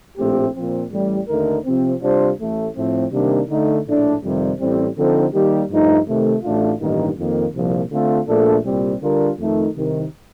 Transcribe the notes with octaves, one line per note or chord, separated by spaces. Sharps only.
A#1 A2 A3 C4 G4
A#2 F3 C4
A1 A2 G3
D#2 D3 A3 D#4 A#4
C3 F3 C4
C3 G3 D4 F4 C5
A1 A2 A3
A2 F3 A3 C4
C3 D#3 G3 A#3 D4
D3 A3 D#4
A#1 A2 A3 D4
F2 C3 D#3 G3
A1 A2 G3 C4
D3 F3 C4 D#4 A4
D#3 G3 A#3 D#4 G4
G2 F3 A3 D#4
C3 D#3 A3
A1 A2 A3 D4 F4
A1 G2 D#3 A#3 D#4
F2 D#3 A#3
C2 A#2 F3
D3 A3 C4 F4 A4
A#1 A#2 A3 D4 A4
C2 A#2 G3 C4 G4
D3 G3 D4 F4 A#4
F2 D#3 A3 D#4
C2 C3 D#3